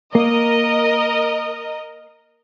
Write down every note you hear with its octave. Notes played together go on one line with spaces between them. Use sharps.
A#3 A#4 D#5